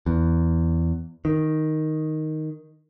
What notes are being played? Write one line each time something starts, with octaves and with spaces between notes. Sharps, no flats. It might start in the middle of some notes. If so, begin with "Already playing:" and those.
E2
D#3